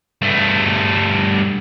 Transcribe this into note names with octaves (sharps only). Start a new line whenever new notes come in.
G2 A3